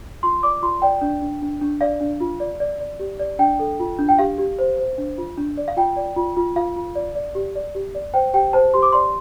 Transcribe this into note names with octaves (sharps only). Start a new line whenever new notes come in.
F4 C6
D5 D6
F4 C6
D5 G5
D4
D4
D4
D4
D5 F5
D4
F4
D5
D5
D5
G4
D5
D4 G5
A4
F4
D4
G5
G4 F5
G4
C5
C5
D4
F4
D4
D5
F5
F4 G5
D5
F4
F4
F4 F5
F4
D5
D5
G4
D5
G4
D5
C5 G5
G4 G5
C5 A5
G4 C6
D6
D5 C6